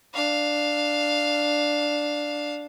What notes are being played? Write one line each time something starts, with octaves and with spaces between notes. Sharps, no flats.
D4 F5